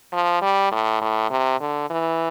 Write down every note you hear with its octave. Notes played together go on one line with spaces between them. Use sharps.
F3
G3
A2
A2
C3
D3
E3